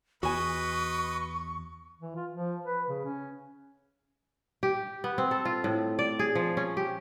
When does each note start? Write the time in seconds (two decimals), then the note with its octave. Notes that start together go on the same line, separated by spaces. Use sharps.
0.23 E2 F#4 B4 D#5 G#5 C#6
2.02 E3
2.16 F4
2.32 F3
2.66 B4
2.89 C#3
3.05 C#4
4.63 G4
5.04 B3
5.18 C4
5.31 A4
5.45 F4
5.64 A2
5.99 D5
6.19 G#4
6.35 F3
6.57 C#4
6.77 G4